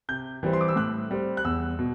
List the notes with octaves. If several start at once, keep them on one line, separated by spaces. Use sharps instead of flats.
C3 G6
E3 G3 C4
C6
D6
E6
A2 F#6
G3 C4
F#6
E2 E6
B2